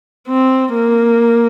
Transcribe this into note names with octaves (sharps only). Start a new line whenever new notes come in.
C4
A#3